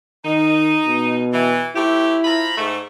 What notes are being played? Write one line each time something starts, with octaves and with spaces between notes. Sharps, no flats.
D#3 D#4
B2
E3
A3 C4 E4 G4
F3 A#5 B5
G#2 A3